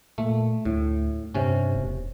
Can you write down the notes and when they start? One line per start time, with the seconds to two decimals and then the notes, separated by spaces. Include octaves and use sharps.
0.18 A#2 A3
0.65 D2 A2
1.34 G2 C3 C#4
1.75 E1